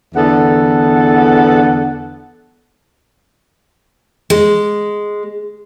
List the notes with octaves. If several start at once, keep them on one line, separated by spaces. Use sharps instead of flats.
E2 D3 B3 A4 F#5
G#3